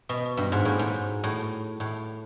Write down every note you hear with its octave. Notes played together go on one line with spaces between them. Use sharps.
B2
G2
G#2
A2
G#2
A2
A2